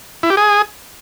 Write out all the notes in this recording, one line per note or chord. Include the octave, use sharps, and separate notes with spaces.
E4
G4
G#4